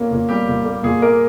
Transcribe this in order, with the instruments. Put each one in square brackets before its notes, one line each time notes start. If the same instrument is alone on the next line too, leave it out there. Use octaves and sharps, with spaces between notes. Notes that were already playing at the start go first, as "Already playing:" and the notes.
Already playing: [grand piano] A#2 A#3 C#4
A#2
G3 G4
A#2
A#3
A#2 G#4
A#3 A#4